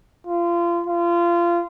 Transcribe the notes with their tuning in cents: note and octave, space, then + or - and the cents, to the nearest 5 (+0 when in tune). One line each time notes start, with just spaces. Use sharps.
F4 -25
F4 -25